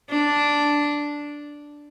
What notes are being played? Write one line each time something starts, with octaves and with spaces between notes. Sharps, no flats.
D4